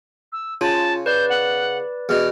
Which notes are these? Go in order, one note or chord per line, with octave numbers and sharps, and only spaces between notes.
E6
C#3 F4 A5
B4 D5 G6
F#5
E2 B2 F6